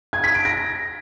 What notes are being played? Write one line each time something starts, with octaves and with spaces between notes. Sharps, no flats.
G#6
B6
D7
A#6